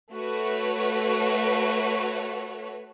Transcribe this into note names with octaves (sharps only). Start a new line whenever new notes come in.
A3 F#4 B4 C#5